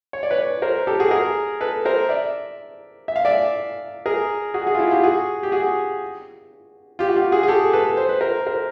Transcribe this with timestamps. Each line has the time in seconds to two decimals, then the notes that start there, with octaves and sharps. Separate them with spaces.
0.13 C#5
0.23 D5
0.30 B4 C#5
0.62 A#4 C5
0.87 G4 A4
0.99 F#4 G#4
1.11 G#4 A#4
1.61 A4 B4
1.85 A#4 C5
2.09 D5 E5
3.08 E5
3.16 F5
3.25 D5 E5
4.06 G#4 A#4
4.54 F#4 G#4
4.66 F#4 G#4
4.75 F4
4.79 E4 F#4
4.91 F4 G4
5.03 F#4 G#4
5.43 G4
5.52 F#4 G#4
6.99 F4 G4
7.09 F#4
7.16 F4 G4
7.32 F#4 G#4
7.43 G#4
7.48 G4 A4
7.73 A4 B4
7.97 C5
8.09 B4
8.21 A#4 C5
8.46 A#4 C5